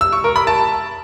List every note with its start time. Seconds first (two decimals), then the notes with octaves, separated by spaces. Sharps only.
0.01 E6
0.12 C#6
0.24 A#4
0.36 B5
0.47 A5